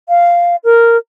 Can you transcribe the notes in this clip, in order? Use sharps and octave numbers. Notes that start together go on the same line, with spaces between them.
F5
A#4